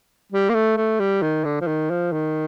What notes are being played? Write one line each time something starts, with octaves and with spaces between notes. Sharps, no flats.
G3
A#3
A3
A3
G3
D#3
D3
F3
D#3
F3
D#3